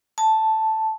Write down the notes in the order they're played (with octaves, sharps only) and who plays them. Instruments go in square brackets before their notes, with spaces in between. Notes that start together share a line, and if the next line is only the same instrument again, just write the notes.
[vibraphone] A5